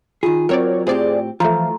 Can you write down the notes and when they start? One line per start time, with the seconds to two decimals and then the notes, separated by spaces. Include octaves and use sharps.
0.23 D#3 F4 G#4
0.49 F#3 C4 A#4 C#5 D5
0.87 A2 C4 G4 G#4 C5 D5
1.40 E3 F3 A3 F4 A#5